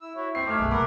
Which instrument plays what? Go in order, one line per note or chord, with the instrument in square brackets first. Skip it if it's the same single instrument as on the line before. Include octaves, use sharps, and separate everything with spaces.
[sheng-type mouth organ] E4 E6
[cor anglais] E4 [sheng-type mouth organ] F#4 C#5
[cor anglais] C4 [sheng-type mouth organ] E4 C#6 [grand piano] C7
[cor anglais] A3 [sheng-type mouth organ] D#4 [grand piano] D6 F6 G#6
[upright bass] B1 F#2 [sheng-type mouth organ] G#4 B4
[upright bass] C3 A#3 [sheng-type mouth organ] A#4 F#5 [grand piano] B5 D6